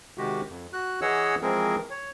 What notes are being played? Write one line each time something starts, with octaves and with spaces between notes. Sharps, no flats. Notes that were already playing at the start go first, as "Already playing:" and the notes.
C3 D#3 G#3 F#4 G4
F2
F#4 F#6
E3 G#4 C#5 D#5 F#5 E6
E3 F3 G#3 C4 G#4 A#4
C#5